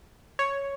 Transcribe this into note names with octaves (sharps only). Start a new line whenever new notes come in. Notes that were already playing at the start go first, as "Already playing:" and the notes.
C#5